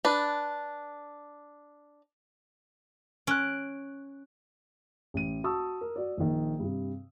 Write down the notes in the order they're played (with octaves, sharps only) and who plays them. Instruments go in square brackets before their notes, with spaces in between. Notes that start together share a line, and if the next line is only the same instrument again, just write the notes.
[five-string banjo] D4 B4
[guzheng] C#4 [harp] F#6 D7
[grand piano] A1 D#7
F#4 A5 C#6 D#6 E6
A#4
F#4 D5
A#1 D#3
G2 C3